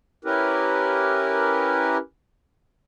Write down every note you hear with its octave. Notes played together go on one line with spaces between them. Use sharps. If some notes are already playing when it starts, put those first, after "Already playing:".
C#4 E4 G4 A#4 B4